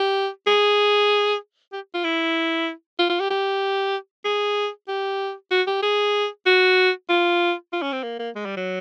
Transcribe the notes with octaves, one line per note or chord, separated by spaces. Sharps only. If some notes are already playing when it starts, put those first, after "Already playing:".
Already playing: G4
G#4
G4
F4
E4
F4
F4
G4
G4
G#4
G4
F#4
G4
G#4
F#4
F4
F4
C#4
C4
A#3
A#3
G#3
G3
F#3